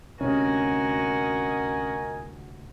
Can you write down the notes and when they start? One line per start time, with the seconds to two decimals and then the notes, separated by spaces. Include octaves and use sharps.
0.21 D2 C3 C#4 F#4 A#4 D#5 G#5